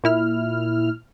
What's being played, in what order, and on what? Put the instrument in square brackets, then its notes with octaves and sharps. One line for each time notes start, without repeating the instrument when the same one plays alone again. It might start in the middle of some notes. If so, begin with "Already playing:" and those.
[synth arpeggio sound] A#2 E4 F6